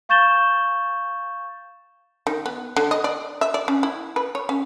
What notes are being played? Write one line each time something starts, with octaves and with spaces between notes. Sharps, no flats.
F5 C#6 G6 A6 E7 G7
D#3
B3
D3
D#5
D5
E5
D5
C#4
E4
B4
C#5
C#4